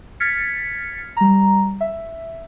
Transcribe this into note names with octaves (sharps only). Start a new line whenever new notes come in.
F6 G#6 A6 B6 C#7
G3 A#5
E5